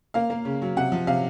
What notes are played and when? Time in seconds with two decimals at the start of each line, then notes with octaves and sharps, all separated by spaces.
0.14 A#3 F5
0.30 A#3
0.45 C#3
0.62 F#3
0.77 C3 F#5
0.92 F3
1.07 C3 F5